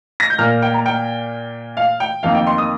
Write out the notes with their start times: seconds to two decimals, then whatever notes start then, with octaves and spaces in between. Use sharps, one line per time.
0.20 A#6
0.30 G6
0.38 A#2 A#3 F6
0.62 G5
0.74 A#5
0.86 G5
1.77 F5
2.00 G5
2.23 F2 D#3 A#3 F5
2.35 G5
2.47 C6
2.58 D#6